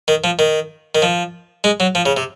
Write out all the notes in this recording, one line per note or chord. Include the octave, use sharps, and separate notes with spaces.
D#3
F3
D#3
D#3
F3
G#3
F#3
F3
C#3
C3